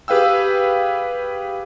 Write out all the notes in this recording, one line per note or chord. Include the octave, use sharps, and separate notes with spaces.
G4 G#4 B4 F5 G5 E6